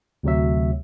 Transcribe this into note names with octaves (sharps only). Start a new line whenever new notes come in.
D2 C3 F#3 E5